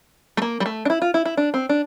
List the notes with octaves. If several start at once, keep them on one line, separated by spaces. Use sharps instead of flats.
A3
A#3
G3
A3
D4
E4
F4
E4
E4
D4
C4
D4